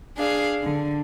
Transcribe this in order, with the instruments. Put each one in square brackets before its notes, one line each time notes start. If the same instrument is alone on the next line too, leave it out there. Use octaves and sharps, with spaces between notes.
[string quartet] D4 G#4 F5
D3